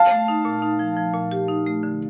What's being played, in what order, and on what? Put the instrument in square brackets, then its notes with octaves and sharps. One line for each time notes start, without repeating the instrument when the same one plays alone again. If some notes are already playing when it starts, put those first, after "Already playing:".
Already playing: [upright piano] F5 A5
[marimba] A3
D#4
A#2
D#4
F3
F3
A#2
G4
D#4
A3
D3